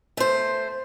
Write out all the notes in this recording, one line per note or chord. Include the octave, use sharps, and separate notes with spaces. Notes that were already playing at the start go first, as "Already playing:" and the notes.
A3 C5